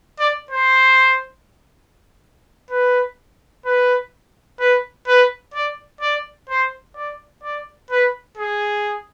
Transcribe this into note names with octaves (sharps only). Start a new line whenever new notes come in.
D5
C5
B4
B4
B4
B4
D5
D5
C5
D5
D5
B4
G#4